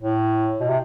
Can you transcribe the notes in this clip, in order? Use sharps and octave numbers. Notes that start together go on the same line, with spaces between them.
A2
B2
C3